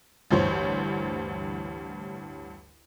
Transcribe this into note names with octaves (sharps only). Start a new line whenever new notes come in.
A1 D2 G2 C5 C#5